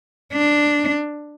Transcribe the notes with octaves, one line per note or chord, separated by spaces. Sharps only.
D4